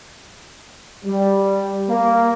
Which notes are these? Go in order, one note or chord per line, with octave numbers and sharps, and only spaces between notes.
G3
A#3